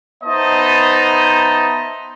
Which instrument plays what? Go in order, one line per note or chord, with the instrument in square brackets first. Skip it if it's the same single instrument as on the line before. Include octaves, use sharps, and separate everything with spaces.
[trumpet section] B3 D#4 C5 D#5 E5 A5